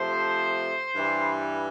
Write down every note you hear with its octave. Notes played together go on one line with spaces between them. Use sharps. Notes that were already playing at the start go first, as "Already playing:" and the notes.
Already playing: C3 F3 A3 C5
G2 E3 G3